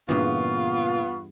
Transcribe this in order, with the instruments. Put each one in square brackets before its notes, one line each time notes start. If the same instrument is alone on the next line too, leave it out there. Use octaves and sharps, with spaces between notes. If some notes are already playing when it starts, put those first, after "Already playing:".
[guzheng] E2 G2 [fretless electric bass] A#2 C#3 E3 [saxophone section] B3 F4 [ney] C#6